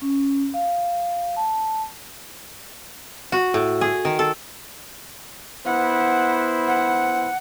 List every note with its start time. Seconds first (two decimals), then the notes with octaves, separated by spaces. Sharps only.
0.02 C#4
0.54 F5
1.36 A5
3.32 F#4
3.54 A2
3.81 G#4
4.05 D#3
4.19 A4
5.66 B3 E4 C5 F#5
6.68 F#5